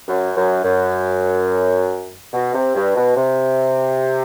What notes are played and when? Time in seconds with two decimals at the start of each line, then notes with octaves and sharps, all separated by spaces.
0.08 F#2
0.36 F#2
0.64 F#2
2.34 B2
2.54 C3
2.75 G2
2.96 B2
3.17 C3